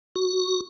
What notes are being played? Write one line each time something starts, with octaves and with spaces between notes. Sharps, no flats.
F#4